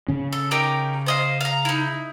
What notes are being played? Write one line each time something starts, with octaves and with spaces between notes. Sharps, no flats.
C#3 C#4
A4
D#4 G4 A#4
C5 D#5 F5
F5 A#5
D#4 E4